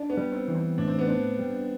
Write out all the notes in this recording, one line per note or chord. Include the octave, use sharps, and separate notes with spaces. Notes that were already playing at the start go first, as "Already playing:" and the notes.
Already playing: D4
B3
G3
C4
E3
C4
A2 D4
C4
B3
C4 D4
G3